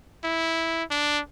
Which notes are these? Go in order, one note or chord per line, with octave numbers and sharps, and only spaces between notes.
E4
D4